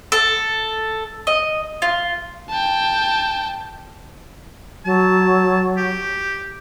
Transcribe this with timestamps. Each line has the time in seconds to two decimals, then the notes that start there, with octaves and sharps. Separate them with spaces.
0.12 A4
1.27 D#5
1.82 F4
2.50 G5 A5
4.85 F#3 A5
5.77 G4